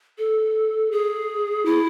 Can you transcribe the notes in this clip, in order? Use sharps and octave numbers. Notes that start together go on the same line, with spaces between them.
A4
G#4
E4